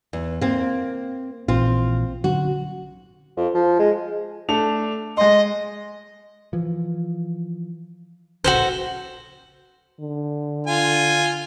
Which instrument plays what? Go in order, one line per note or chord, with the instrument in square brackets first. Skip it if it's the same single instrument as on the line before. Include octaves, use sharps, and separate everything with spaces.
[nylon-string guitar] E2
A#3 C4
[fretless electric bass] A#1 A#2 E3 [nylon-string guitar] C4 F4
[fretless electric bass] D3 F#3 C#4 [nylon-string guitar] F#4
[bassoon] F2
F3
G#3
[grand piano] A3 D4 F7
[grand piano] G#3 C6 [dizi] D#5
[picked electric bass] E3 F3
[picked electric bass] D1 A#1 C#3 [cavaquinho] F#4 A4 C5
[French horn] D3
[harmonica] F4 G#5